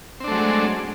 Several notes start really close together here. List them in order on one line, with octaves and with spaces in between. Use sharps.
C4 D4 A3 F#3 G#3